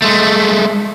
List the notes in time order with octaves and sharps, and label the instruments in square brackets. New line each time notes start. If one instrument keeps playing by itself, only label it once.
[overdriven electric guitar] G#3 A3